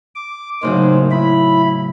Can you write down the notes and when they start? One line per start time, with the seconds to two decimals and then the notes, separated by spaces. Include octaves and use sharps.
0.15 D6
0.63 A2 C#3 F#3 A#3 D#4 C5
1.11 E4 B5